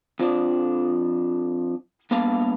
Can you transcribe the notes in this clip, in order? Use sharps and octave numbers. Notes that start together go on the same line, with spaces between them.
F2 F3 D4
G2 A#3 B3 F5 A5